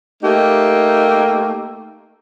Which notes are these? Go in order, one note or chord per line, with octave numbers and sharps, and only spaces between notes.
A3 A#3 D#4 G4